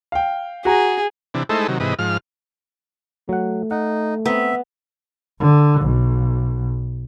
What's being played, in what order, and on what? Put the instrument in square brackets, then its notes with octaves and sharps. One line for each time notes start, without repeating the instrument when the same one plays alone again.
[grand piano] F5 G5
[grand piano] F#4 A#5 [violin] G#4
[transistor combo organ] C3 E3 D4
G#3 A3 D#4 E4 A4 C5
C3 D#3 F#3
G#2 C3 E3 B4 D#5
G#2 F3 F6
[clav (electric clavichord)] F#3 F#5 [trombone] A3
[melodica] D#4 [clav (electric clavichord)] F#5
[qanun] B3 [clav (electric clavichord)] C4 A#5 [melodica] E5
[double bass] D3
B1